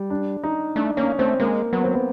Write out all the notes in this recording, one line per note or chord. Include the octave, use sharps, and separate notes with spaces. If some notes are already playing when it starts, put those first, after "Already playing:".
Already playing: G3
D4
D#4
A3 D4
A#3 C#4
A3 C4
G#3 A#3
F#3 B3
C4
B3